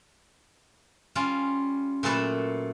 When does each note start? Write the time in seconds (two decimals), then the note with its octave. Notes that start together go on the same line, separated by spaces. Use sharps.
1.15 G3 C#4 F4
2.03 A#2 F#3 A3 A4 B4 E5